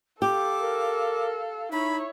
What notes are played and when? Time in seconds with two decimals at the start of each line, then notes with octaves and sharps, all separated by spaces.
0.22 G4 A4 F5 D6
0.61 A#4
1.72 D#4 E4 C#5 B5